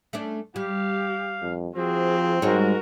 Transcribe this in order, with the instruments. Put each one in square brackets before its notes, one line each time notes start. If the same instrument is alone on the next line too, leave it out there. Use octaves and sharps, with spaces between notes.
[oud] A3 C#4 D4
[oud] G3 [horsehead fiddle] G4 [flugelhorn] F5
[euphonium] F2
[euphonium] F3 [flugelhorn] C4 [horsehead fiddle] F#4 G#4
[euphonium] G#2 [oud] G3 G#3 C#5 [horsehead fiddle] F#4 A#4